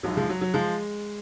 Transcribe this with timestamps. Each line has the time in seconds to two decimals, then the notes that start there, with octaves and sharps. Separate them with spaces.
0.03 A#1 G#2 F3 F#3
0.17 F3 G#3
0.29 F#3
0.41 F#3
0.54 F3 G#3